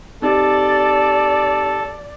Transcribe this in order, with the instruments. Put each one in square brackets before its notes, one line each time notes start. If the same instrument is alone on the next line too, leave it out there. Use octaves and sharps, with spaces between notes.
[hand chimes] C4 D#4 G4 [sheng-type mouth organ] A4 [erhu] D5